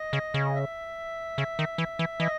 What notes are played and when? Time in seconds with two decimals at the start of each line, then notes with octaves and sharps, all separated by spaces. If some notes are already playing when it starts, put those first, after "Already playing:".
Already playing: D#5
0.13 C#3
0.34 C#3
0.55 E5
1.38 C#3
1.59 D#3
1.78 E3
1.99 E3
2.20 E3 D#5